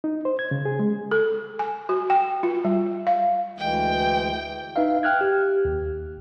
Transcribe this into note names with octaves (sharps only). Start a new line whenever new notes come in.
D#4
C5
G#6
C#3
G#4
G#3
A4
G#5
F#4
G5
F4
G3
F5
D2 E3 G#3 G5
D#4 B4 E5 F5
G5 F6 F#6 G#6
G4
D#2